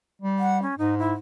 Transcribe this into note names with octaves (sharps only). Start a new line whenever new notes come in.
G3
F#5
C#4
G#2 D#4
E4